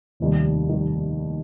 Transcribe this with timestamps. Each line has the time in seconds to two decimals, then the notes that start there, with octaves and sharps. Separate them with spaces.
0.20 F1 D#2 D#3 G3
0.69 D#3 G3